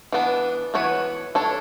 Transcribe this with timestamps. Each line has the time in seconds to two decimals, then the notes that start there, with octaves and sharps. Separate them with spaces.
0.12 E3 B3 D4
0.74 E3 B3 F#4 C#5
1.35 D4 A4 C#5